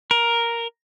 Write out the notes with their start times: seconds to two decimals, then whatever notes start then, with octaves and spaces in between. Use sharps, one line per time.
0.11 A#4